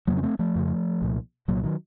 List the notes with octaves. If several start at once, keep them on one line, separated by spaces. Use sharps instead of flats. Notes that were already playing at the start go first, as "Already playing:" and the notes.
F2 C#3 F#3 A#3
C#4
A3 C4
F3 A3
F2 C#3
C2 A#2
C2 A#2 F#3 A#3
D#3 F#3